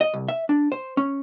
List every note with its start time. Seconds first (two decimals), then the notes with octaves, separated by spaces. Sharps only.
0.01 D#5
0.14 C2
0.28 E5
0.49 D4
0.72 C5
0.97 C#4